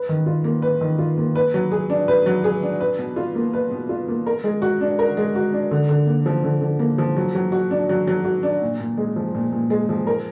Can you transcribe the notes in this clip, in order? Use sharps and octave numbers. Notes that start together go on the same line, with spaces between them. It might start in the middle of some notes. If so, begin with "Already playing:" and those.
Already playing: B4
D#3
F4
A#3
B4
D#3
F4
A#3
B4
F#3
G#4
D4
B4
F#3
G#4
D4
B4
B2
F4
A#3
B4
B2
F4
A#3
A#4
G#3
F#4
D4
A#4
G#3
F#4
D4
D3
D3
A#3
F3
D3
D3
A#3
F3
F#3
F#3
F#4
D4
F#3
F#3
F#4
D4
A#2
A#2
G#3
F3
A#2
A#2
G#3
F3
A#4